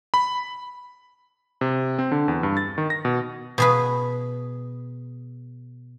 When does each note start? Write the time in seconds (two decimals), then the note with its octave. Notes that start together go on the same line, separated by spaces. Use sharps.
0.14 B5
1.61 C3
1.99 C4
2.12 D3
2.28 E2
2.43 G2
2.57 A6
2.78 D#3
2.90 A#6
3.05 B2
3.58 B2 G#4 B4